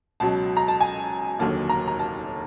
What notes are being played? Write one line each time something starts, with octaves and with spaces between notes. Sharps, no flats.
C#2 B2 F#3 A5
A#5
A5
G#5
F1 D#2 D3 F#3 A#3 A5
A#5
A#5
A5